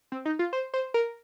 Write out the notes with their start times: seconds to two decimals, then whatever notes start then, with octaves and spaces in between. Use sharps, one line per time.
0.12 C4
0.25 D#4
0.39 F4
0.53 C5
0.74 C5
0.94 A#4